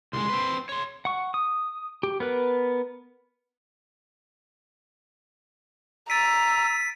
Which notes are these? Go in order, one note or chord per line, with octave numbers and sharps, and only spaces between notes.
C2 G#3 C6
C4 B4
C#5 C6
F#5 C#6
D#6
G4
B3 A#4 B4
A#5 E6 A6 B6 D7 D#7